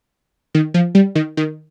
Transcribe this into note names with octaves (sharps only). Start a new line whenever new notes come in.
D#3
F3
G3
D#3
D#3